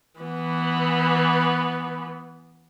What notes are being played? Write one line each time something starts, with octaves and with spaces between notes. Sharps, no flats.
E3 B3